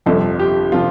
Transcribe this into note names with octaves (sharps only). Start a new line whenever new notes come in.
G1 F2 C3 F3 A4
G4
C3 F3 F4